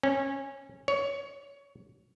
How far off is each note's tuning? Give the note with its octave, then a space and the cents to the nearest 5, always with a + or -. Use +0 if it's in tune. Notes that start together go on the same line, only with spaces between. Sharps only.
C#4 -20
C#5 +15